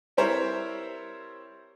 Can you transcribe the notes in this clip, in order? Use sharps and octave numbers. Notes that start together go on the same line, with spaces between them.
G3 C4 E4 A#4 C5 C#5